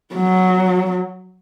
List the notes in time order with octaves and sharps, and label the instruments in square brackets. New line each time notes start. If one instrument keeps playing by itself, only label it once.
[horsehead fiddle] F#3